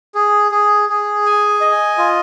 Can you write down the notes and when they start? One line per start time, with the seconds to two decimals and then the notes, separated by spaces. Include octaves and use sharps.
0.15 G#4
0.51 G#4
0.89 G#4
1.26 G#5
1.61 D#5
1.98 F4